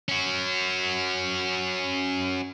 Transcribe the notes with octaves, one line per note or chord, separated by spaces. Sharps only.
C#4 F#4